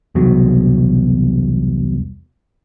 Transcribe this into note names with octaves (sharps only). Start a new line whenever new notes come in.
E1 C2 B2 F#3